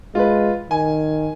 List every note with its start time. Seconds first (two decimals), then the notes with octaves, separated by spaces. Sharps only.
0.15 G#3 F4 B4
0.71 D#3 G#5